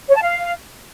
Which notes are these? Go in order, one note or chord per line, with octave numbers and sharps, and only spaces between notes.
C#5
A5
F5